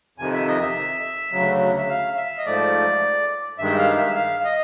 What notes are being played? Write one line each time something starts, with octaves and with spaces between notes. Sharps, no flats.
F2 C3 D#3 G#5
E5
D#5
E5
D2 C#3 F#3
E5
F5
E5
D#5
G#2 F3 A3 D5
G2 D#3 G#3 E5
F5
E5
F5
D#5